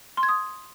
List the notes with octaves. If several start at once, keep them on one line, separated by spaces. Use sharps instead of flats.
C6
G#6
D#6